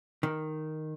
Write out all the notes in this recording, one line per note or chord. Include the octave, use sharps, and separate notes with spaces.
D#3